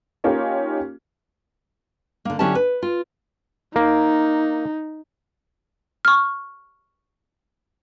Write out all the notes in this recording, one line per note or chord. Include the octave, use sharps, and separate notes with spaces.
A#3 C#4 D#4 F4 G4 A#4
D3 A#3
D3 F#3 C#4 E4 G4 A5
B4
F4
A#3 D#4
C#6 F6